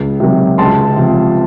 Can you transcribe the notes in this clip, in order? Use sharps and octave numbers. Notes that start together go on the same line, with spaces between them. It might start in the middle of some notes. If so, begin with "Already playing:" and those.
Already playing: C#2
C3 D#3 F#3
C#2 A5 C6
C3 F3